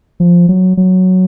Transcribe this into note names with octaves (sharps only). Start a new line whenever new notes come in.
F3
F#3
F#3